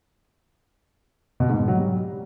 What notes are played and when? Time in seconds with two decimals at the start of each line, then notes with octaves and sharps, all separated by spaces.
1.40 B2
1.49 G#2
1.59 B2
1.68 F#3
1.77 G3